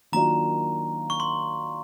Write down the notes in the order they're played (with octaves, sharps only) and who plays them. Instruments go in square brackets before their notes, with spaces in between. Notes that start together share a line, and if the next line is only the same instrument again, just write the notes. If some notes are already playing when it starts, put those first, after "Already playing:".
[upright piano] D#3 F#3 A#3 D4 F4 [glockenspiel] A#5
[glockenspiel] C#6
C6